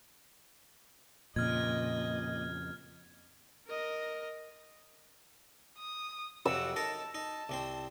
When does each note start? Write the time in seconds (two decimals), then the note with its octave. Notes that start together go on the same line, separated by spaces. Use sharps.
1.36 F2 A#2 C#3 D#5 F6 G#6
3.67 A#4 D#5
5.78 D#6
6.46 F2 C3 F#3 F#5 E6
6.76 D#4 A4 A#4 A5
7.15 D#4 A5
7.49 C2 C4 C5